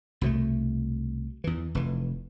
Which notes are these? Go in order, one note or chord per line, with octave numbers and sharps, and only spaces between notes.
C2 B2 F3 A3
E2 E3
F1 E3